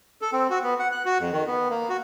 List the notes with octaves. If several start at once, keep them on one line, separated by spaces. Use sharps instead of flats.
A4
C4
F#4
B3
F#5
F#6
F#4
F2
D#3
B3
A#3
F#4